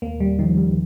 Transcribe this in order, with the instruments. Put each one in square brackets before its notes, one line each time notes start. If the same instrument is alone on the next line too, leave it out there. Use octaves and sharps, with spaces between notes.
[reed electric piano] D#2 [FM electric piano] A#3
[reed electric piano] D#2 [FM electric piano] G3
[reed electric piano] D#3 [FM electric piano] F3
[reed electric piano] G3